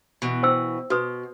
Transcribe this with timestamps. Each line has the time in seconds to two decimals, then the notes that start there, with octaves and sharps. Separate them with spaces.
0.22 B2 E3
0.43 C5 G5 E6
0.90 B2 F#4 B4 D#6